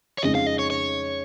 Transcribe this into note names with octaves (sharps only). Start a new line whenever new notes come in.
C#5
F2 C#3 G#3 D#4 D#5
F5
D#5
C#5
C#5